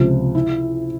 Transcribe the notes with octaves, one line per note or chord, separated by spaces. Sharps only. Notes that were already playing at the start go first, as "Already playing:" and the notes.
Already playing: C#2 C3 F3
E4